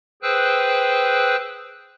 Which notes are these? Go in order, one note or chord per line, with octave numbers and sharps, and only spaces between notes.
G#4 B4 C5 G5 E6 F#6